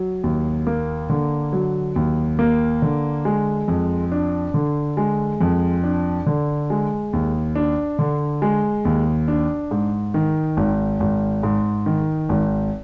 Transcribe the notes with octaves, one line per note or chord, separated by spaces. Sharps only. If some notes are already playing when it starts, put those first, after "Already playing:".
Already playing: F#3
D#2
A#3
D3
F#3
D#2
A#3
D3
G#3
F2
D4
D3
G#3
F2
D4
D3
G#3
D#2
D4
D3
G#3
D#2
D4
G#2
D#3
G#1
G#1
G#2
D#3
G#1